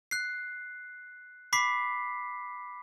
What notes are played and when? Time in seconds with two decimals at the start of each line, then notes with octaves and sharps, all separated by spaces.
0.11 F#6 C7
1.53 B5 D6 B6 C7